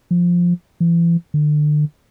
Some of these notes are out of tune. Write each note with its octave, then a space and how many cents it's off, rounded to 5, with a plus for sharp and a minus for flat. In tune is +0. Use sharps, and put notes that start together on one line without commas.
F3 +5
E3 +40
D3 +30